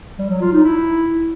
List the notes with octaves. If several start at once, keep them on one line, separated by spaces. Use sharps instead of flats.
G3
F#3
F4
D#4
E4